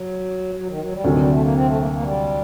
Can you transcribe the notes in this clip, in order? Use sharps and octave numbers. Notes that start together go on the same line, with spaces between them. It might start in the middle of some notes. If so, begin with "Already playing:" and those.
Already playing: F#3
F#3
D#3
F#3
G3
D2 C3 D#3 F#3
G3
A3
A#3
C4
A3
A#3
A#3
G3